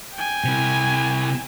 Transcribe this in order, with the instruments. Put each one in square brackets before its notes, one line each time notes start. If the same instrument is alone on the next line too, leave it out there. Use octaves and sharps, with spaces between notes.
[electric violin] G5 G#5
[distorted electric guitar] C3 E4